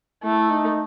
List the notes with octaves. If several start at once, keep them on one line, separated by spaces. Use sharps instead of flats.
A3 E4
D#4